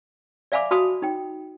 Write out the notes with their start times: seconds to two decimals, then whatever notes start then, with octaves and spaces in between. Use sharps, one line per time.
0.52 D5 E5 F5 G#5 B5 D6
0.71 F#4 F5 A5 B5 D#6
1.02 D#4 G5